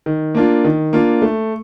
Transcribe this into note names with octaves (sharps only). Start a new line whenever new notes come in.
D#3
A#3 D4 F4
D#3
A#3 D4 F4
A3